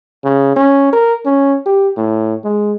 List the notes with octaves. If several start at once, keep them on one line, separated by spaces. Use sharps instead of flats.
C#3
C#4
A#4
C#4
G4
A2
G#3